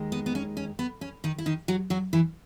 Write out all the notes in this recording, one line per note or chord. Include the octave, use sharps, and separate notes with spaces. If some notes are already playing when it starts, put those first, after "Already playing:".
Already playing: D#2 D#3 G#3
B3
B3
C#4
C#4
B3
C#4
D#3 D#4
E4
D#3 D#4
F#3 F#4
F#3 F#4
E3 E4